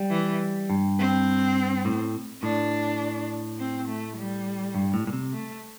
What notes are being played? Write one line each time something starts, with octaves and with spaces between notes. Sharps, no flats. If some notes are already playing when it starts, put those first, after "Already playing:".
Already playing: G3
E3
G2
C4
A2
A2 D4
C4
A3
G3
G2
A2
A2
C3
A3